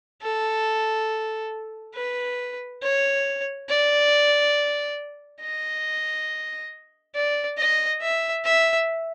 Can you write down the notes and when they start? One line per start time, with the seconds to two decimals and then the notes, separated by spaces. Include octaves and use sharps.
0.22 A4
1.94 B4
2.82 C#5
3.68 D5
5.41 D#5
7.15 D5
7.58 D#5
8.01 E5
8.45 E5